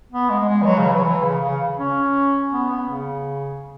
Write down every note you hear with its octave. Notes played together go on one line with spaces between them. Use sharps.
B3
G#3
G#3
E3
F#3
C#3
E3
F#3
E3
C#3
C#3
C#4
B3
B3
C#3